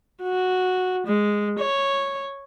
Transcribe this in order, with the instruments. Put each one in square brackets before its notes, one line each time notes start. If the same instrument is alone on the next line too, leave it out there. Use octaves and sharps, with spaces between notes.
[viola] F#4
G#3
C#5